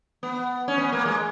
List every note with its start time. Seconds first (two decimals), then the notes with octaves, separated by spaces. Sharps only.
0.23 B3
0.68 C#4
0.78 B3
0.92 A#3
1.06 G#3